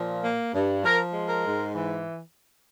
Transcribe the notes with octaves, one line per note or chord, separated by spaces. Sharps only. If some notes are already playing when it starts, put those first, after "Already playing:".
Already playing: A#2 F3
A#3
G2
F3 A#4
G#3
A#4
G#2
E3